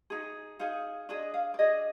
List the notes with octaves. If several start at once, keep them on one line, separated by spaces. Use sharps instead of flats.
D#4 G#4
D#4 G#4 F5
D4 G#4 D#5
F5
D5
D4 G#4 D#5